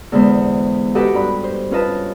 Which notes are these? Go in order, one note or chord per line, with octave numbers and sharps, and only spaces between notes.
E2 D3 G#3 B3 C5
F#4 G4 A4 B4 D#5 F#5
G2 B5
C5
C#4 F4 B4 D#5 A5